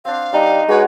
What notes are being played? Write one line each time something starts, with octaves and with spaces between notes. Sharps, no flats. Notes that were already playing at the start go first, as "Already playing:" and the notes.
C4 D4 F5
G3 D4 D#4 D#5
G#3 F#4 B4 C#5 F#5